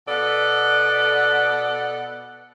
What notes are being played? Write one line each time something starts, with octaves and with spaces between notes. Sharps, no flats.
B2 B3 A4 D5 F#5